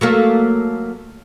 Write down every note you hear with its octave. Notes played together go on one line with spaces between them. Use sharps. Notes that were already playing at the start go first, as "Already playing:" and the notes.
F#3 A3 A#3